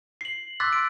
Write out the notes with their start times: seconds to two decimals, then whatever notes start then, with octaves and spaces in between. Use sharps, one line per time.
0.21 C7 F#7
0.60 C6 D6 E6 F#6 A6 B6
0.73 D7